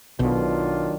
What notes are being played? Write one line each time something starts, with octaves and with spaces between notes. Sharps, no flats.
B1 B2 D#3 F#3 D4 F4